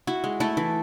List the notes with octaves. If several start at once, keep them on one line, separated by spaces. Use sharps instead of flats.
E4 F#4
G#3
A3 E4 A4
E3